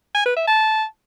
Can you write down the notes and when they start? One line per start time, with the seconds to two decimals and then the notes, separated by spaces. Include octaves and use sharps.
0.15 G#5
0.26 B4
0.36 E5
0.47 A5